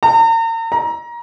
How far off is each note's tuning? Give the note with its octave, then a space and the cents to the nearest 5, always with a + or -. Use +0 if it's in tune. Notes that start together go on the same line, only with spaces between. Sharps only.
A#5 -40
A#5 +20